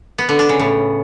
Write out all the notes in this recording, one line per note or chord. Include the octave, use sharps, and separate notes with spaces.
B3
D3
D4
C#3
A2